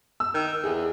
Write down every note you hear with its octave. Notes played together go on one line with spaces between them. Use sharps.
E6
D#3
E2 G#4